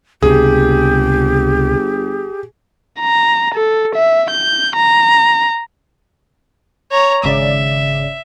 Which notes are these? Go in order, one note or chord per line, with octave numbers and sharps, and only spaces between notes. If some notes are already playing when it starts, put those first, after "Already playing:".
G1 C#2 C3 G4 G#4
A#5
A4
E5
G6
A#5
C#5 A#5
G#1 C#3 D5 E5